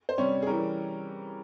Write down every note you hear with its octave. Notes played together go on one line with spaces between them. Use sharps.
C5
C3 G3 C#4 C#5
G#4
E3 G3 C#4 A#4